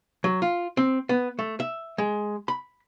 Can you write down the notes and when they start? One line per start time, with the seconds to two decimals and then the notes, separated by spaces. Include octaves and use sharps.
0.24 F#3
0.42 F4
0.77 C4
1.09 B3
1.39 A3
1.60 E5
1.98 G#3
2.48 B5